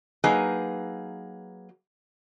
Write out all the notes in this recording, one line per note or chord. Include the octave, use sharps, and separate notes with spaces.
F#3 A#3 D#4 G#4 B4